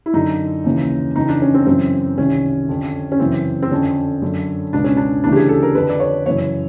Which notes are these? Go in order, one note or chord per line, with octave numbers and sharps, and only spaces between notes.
E4
F#2 D3 D#4
D#2 C#3 E3
F2 C#3 E3 D#4
D4
C#4
C4
F#2 C#3 E3 C4
C2 C3 D#3 C#4
F2 D3
C#4
F#2 C#3 E3 C4
C4
F2 D3 C#4
F#2 D3
C#2 B2 D4
C#4
D4
D2 C#3 E3 D4
G4
G#4
A4
A#4
F2 D3 B4
D5
C#5
F#2 C#3 E3 C#5